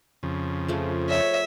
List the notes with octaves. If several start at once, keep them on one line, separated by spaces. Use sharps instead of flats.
F2 C#3
F3 A3 G#4
C#5 E5